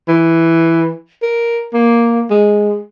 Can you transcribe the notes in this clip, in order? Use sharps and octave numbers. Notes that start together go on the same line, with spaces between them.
E3
A#4
A#3
G#3